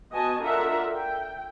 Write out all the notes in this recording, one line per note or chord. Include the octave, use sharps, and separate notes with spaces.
B3 F#4 D#5 G#5 A5
D4 F4 A4 A#4 E5 F#5
G5